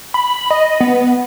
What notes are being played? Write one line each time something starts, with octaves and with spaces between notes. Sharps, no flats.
B5
D#5
B3